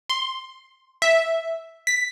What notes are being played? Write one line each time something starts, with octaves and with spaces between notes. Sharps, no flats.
C6
E5
B6